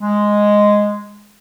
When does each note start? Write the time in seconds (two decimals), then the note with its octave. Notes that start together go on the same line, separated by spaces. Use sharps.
0.01 G#3